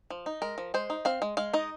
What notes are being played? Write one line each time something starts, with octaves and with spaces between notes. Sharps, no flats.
F3
D#4
G#3 A#4
F3
G#3 C5
D#4
C4 F5
G#3
G#3 F5
D#4 D#5